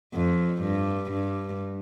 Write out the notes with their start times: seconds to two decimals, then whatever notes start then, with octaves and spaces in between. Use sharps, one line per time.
0.14 F2
0.61 G2
1.11 G2